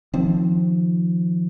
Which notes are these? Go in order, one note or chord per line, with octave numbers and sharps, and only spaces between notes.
D#3 F3 C4